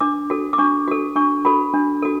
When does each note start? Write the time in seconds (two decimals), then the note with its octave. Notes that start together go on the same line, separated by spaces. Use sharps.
0.01 D4 D6
0.30 F#4 A4
0.53 D6
0.58 D4 C#6
0.88 F#4 A4
1.16 D4 C#6
1.45 F#4 A4 B5
1.74 D4
2.02 F#4 A4